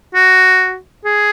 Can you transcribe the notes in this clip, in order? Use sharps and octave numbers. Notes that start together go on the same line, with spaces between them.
F#4
G#4